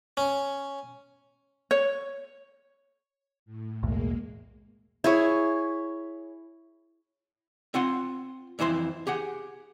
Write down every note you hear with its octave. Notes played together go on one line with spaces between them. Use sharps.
C#4
C#5
A2
B1 E2 A2 G#3 A#3
E4 G#4 C#5
C4 F4 F#5 C6
F2 E3 E4 C5 C6
G4 G#4 F#5